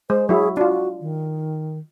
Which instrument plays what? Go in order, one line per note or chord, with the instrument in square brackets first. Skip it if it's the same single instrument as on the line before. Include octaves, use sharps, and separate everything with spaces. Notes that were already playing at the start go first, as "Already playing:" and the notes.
[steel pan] G#3 [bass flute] C5
[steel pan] F#3 E4 [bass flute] G#4
[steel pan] D4 F4 [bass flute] F#4
[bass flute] D#3